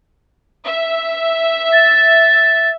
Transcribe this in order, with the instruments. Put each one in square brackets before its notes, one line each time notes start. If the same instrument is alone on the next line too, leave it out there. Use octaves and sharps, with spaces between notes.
[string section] E5
[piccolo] A6